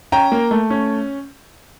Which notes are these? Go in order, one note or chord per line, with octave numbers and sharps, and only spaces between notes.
C#4 G5 A#5
A#3
A3
C#4